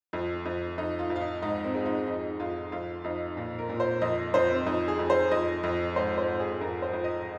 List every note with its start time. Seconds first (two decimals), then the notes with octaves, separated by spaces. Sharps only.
0.13 F2
0.45 F2
0.78 F2 D#4
0.99 F4
1.10 F2
1.16 F4
1.21 D#4
1.42 G#2 D#4
1.64 C4
1.75 G#3
1.86 D#4
2.07 F2 D#4
2.40 F2 F4
2.72 F2 F4
3.04 F2 D#4
3.37 A#2 F4
3.58 A#4
3.69 A#2
3.80 C5
4.01 F2 D#5
4.34 F2 C5
4.51 C4
4.66 F2 D#4
4.88 G#4
4.99 F2
5.10 C5
5.31 F2 D#5
5.63 F2
5.96 G#2 C5
6.18 C5
6.28 G#2
6.39 G#4
6.61 F2 A#4
6.82 C5
6.93 F2
7.04 D#5